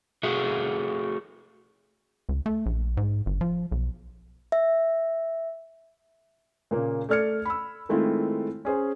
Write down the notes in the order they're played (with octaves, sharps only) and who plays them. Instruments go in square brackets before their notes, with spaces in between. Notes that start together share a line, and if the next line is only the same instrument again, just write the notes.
[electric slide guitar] A3 F#4 G#4 E5
[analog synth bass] C#2
A3
A#1
G#2
G1
F3
B1
[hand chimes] E5
[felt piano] A#2 C#3 A#3
A3 A4 D5 F6 G#6 C#7
B5 E6
D#3 G#3 A3 C4 E4 F4
C#4 G#4 C5